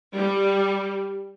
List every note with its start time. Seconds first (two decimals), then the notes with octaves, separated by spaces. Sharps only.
0.15 G3